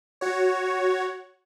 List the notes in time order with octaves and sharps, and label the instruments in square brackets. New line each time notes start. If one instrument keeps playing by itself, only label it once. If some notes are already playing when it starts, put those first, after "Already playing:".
[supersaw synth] F#4 C#5